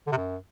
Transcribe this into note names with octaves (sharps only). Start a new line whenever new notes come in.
D3
C3
F#2